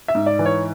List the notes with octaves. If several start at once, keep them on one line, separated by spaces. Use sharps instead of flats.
E5
G#2
D5
E3
C#5